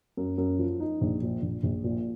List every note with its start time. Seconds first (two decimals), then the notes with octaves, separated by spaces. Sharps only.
0.17 F#2
0.38 F#2
0.59 F3
0.80 D#4
1.01 A#1
1.22 A#2
1.42 A#1
1.63 A#1
1.84 A#2